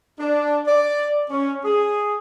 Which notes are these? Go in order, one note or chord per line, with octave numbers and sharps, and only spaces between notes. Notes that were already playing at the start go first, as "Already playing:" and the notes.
D4
D5
C#4
G#4